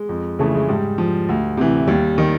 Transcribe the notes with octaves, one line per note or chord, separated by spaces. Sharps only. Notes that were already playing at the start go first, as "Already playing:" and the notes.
Already playing: G#3
F2
C#3 E3 A3
G#3
G#2 G3
F3
D2
C3 E3
D#2 G3
D#3